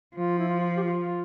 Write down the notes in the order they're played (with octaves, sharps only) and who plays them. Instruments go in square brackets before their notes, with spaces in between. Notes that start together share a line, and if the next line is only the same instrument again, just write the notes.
[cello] F3 [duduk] F4
[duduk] E4
F4
F4
G4
F4